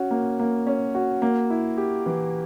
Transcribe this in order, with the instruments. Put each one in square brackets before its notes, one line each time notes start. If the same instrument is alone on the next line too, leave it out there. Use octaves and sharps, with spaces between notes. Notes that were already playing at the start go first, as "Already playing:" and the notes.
Already playing: [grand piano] C#4 F#4
A#3
A#3
C#4
F#4
A#3
E4
G4
E3